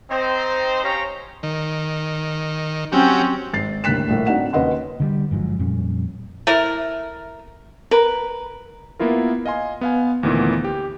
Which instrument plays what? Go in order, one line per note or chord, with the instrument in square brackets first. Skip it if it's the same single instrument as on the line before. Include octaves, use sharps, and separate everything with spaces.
[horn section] C4 D#4 C5
C#4 G4 C#5 F5 G5 A#5
[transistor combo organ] D#3
[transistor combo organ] F#3 G4 [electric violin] C4 C#4
[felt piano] G#1 A6 C7
D#2 A2 D3 F#6 B6 E7
A#1 A2 A#3
C4 D4 D#4 F#4 F#5 E7
D#2 C#4 B4 D#5 F#5 C6
[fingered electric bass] D3 F3 G3
G1 G#2 F3 F#3
F2 A#2 G3 C#4
[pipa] A3 E4 A#4
[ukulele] A#4 [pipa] B4
[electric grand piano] A#3 B3 E4 F4 A#4
D#5 F5 G#5 C6
B3 F5 G#5
D2 A#2 D#3 E3 B3
G4